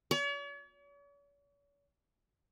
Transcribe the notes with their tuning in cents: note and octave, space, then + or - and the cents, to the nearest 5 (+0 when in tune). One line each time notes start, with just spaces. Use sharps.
C#5 +45